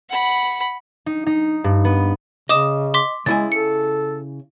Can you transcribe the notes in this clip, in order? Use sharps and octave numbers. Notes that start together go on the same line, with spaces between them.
F#5 B5
D#4
D#4
G2
B3
C#3 D#5 D6 D#6 E7
C6 D6 B6
C#3 G#3 E4 G#5 A6
A4 C#7